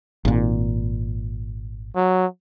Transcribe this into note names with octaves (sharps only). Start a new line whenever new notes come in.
G#1 A#2
F#3